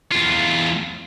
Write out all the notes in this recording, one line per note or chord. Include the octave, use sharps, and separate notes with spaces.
E2 F4